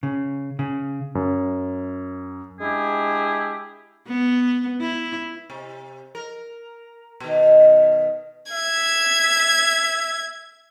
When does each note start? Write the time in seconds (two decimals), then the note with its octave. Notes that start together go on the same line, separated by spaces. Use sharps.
0.03 C#3
0.59 C#3
1.15 F#2
2.61 G#3 D4 E4 G4 G#4
4.08 B3
4.81 E4
5.50 C3
6.15 A#4
7.20 B2 D#3
8.52 E5 G#6